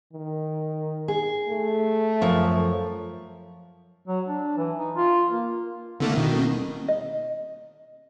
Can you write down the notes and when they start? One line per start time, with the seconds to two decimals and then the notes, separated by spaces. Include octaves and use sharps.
0.13 D#3
1.08 G#4
1.48 A3
2.21 F#2 F3 C#5
4.08 F#3
4.28 D4
4.57 E3
4.79 D#4
4.96 F4
5.31 A#3
6.00 C2 D3 A3 A#3
6.15 B2 D#3
6.33 D#1
6.88 D#5